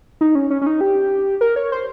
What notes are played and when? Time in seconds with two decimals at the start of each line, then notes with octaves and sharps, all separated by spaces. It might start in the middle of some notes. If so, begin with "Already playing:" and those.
0.21 D#4
0.35 C#4
0.50 C#4
0.62 C#4
0.67 D#4
0.81 G4
1.41 A#4
1.56 C#5
1.72 C5